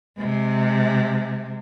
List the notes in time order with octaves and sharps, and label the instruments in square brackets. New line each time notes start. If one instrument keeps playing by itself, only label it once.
[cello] C3 G#3